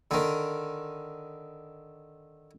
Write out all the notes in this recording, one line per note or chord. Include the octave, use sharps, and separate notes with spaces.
D3 D#3